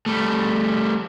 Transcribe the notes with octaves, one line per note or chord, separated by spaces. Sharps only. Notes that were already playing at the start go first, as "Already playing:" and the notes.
G3 A3